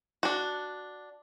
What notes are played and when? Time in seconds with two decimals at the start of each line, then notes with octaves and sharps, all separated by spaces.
0.23 D4 F#4